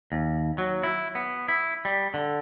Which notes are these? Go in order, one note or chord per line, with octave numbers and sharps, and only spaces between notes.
D#2
F#3
E4
B3
E4
G3
D3